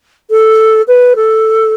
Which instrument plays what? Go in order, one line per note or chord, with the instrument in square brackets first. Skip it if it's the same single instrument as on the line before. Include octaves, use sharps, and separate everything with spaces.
[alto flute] A4
B4
A4